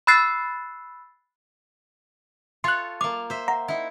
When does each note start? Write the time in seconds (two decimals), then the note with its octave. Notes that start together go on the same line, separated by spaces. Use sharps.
0.07 B5 E6 F#6 A6 C7
2.64 F4 A4 C#5 C6 F#6
3.01 A#3 F5 D6
3.30 C5 E5
3.48 F#5 A#5
3.68 D#4 E4